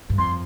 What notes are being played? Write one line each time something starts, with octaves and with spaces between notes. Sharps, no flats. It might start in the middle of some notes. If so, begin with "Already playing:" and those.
G2
F2 C6